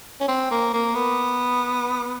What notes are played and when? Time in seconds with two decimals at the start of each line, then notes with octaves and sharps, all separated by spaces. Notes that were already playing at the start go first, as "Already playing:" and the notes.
0.20 C#4
0.28 C4
0.51 A#3
0.73 A#3
0.95 B3